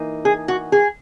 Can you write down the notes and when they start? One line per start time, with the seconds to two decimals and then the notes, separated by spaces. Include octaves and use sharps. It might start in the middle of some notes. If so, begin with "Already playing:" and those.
Already playing: E3 A#3 D#4
0.25 G#4
0.48 F#4
0.72 G#4